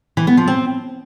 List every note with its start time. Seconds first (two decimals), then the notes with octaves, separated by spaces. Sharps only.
0.17 E3
0.27 B3
0.37 F3
0.48 C4